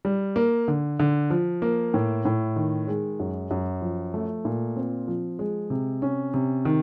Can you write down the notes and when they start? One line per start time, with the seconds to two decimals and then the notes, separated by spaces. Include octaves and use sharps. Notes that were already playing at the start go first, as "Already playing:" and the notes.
0.05 G3
0.36 A#3
0.68 D3
0.99 D3
1.30 F3
1.62 A#3
1.94 A2
2.25 A2
2.56 D#3
2.88 G#3
3.20 F#2
3.51 F#2
3.82 F3
4.14 A3
4.45 A#2
4.76 C4
5.08 F3
5.39 G#3
5.70 C3
6.02 C#4
6.34 C3
6.65 D#3